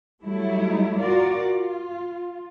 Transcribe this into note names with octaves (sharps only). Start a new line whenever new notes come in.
F#3 G3 A3 E4
F4 F#4 A#4 D5
F4